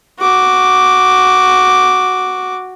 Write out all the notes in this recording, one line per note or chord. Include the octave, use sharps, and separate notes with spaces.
F#4 D6